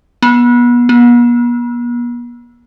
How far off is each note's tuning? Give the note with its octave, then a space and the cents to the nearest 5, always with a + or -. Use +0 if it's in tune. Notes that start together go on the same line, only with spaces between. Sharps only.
B3 -30
B3 -45